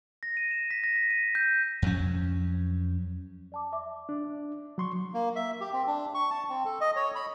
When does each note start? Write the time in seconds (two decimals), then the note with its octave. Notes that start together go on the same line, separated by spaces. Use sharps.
0.23 A#6
0.37 D#7
0.51 E7
0.71 B6
0.84 A#6
0.96 B6
1.10 D#7
1.35 G6
1.82 F2 F#3 C#4
3.52 D5 A5 D6
3.73 E5 D6
4.09 D4
4.78 F#3 C6 C#6
5.14 A#3
5.36 E5
5.61 G4
5.73 C4
5.87 D4
6.14 C#6
6.31 A5
6.49 C4
6.65 A4
6.81 D#5
6.96 C#5
7.15 B5